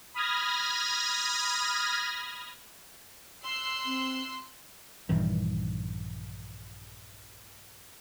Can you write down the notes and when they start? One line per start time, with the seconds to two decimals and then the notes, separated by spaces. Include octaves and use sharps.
0.14 B5 D#6 F6 G#6 A#6
3.44 C6 E6 F#6
3.86 C4
5.09 A#1 G2 D#3 E3